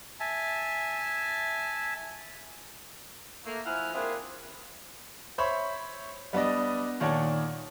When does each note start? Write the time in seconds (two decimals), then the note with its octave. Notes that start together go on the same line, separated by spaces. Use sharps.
0.20 E5 G#5 A5
3.46 A3 A#3
3.66 F3 E4 F#5 G#5 F6
3.94 A#3 C4 D4 E4 F4 G#4
5.38 C5 C#5 E5 B5 C#6
6.33 G3 B3 D4 D5 D#5
7.00 A#2 D#3 C#5 D5 F#5 A5